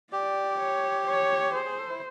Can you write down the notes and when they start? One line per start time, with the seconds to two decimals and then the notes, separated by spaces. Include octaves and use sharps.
0.12 G4 D5
0.60 C#5
1.07 C#5
1.54 G#4 C5
1.65 G#4
1.78 A4
1.89 E4